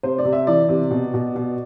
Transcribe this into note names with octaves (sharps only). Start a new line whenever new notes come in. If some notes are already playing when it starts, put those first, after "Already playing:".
C3 C5
D5
C3
E5
E3 D5
C3
B2
B2
B2